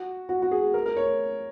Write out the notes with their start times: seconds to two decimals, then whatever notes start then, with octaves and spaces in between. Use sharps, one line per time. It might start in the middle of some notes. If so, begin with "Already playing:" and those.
Already playing: F#4
0.29 F#4
0.42 F#4
0.51 G#4
0.74 A#4
0.86 A#4
0.97 C#5